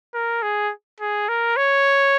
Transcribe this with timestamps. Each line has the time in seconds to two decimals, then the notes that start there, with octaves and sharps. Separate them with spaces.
0.14 A#4
0.43 G#4
1.00 G#4
1.29 A#4
1.57 C#5